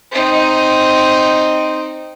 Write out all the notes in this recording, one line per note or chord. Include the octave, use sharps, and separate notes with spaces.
C4 D#4